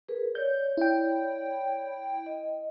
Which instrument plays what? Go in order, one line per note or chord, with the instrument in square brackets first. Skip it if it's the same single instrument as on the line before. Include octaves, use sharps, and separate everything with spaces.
[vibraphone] G#4 A#4 B4
[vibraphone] C#5 D5 [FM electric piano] G6
[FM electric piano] E4 G5
[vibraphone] D#5